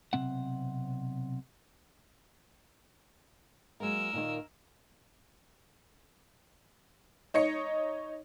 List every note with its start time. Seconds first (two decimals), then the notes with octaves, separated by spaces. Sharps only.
0.13 B1 E2 C3 C4 F#5
3.80 F#3 G#3 A#3 A#4 E6
4.13 A#2 D#3 A#3
7.34 D#4 C#5 D#5 C#7